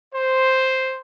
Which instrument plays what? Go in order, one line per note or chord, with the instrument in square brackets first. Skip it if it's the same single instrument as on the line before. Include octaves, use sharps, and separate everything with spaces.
[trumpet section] C5